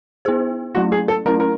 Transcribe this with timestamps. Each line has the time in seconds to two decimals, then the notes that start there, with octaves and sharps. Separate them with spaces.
0.25 B3 E4 G#4 C5
0.75 F#3 A3 C#4 E4 F#4
0.92 G#4
1.08 A4
1.26 F#3 A3 C#4 E4 A#4
1.40 A#4